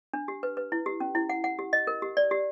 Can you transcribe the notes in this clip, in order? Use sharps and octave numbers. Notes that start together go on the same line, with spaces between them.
D4
G4
B4
B4
E4
G4
C#4
E4
F#5
F#5
G4
D#5
A#4
G4
D5
G4